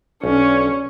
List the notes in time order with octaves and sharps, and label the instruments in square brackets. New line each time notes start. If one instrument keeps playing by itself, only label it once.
[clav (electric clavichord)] B1 [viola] C#4 [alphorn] D4